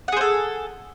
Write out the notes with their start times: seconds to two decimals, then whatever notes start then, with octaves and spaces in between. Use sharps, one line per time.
0.08 F#5
0.12 G#4
0.17 C5
0.21 A4